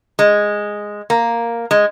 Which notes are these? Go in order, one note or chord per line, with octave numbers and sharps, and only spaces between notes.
G#3
A#3
G#3